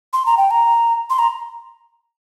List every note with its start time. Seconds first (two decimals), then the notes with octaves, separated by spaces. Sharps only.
0.13 C6
0.26 A#5
0.37 G5
0.51 A#5
1.10 C6
1.19 A#5